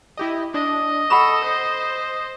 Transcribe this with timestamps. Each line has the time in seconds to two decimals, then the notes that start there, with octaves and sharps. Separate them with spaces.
0.17 E4 G4 D#5
0.54 D4 D#5
1.10 A4 F#5 B5 C#6 E7
1.44 C5